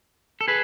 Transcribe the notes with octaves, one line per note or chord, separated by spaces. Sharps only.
A4
G#4 B4